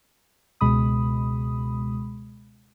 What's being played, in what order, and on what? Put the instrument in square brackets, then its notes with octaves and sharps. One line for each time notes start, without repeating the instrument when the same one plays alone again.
[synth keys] C#2 B2 G#3 B5 D#6